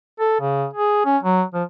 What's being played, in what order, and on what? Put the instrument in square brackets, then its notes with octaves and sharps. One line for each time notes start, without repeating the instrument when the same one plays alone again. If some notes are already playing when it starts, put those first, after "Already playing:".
[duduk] A4
C#3
G#4
C#4
F#3
F3